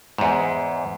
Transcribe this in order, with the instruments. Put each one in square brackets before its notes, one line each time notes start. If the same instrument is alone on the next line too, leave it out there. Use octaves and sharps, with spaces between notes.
[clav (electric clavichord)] E2 G#2